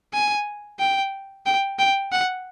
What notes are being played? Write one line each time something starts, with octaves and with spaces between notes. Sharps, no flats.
G#5
G5
G5
G5
F#5